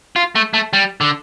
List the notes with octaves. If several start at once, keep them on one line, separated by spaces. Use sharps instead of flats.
F4
A3
A3
G3
D3